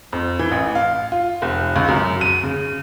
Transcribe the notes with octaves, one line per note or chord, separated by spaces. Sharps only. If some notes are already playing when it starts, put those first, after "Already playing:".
F2
E3
A1
F5
F4
F1
C#2
F#2
D#7
C#3